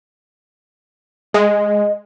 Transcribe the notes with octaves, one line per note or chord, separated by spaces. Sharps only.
G#3 D#5